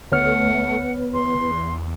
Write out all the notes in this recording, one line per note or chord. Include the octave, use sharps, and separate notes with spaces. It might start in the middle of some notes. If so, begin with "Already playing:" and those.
D2 A3 B3 C#5 F#5 F6
E2 C6